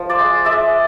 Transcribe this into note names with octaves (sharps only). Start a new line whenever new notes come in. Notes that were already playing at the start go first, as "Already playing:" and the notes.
Already playing: F3
C5 D5
G#3
G#3 D5 E5